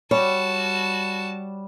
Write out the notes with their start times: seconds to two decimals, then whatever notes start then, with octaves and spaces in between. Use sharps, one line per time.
0.11 G3 F#4 C#5 A5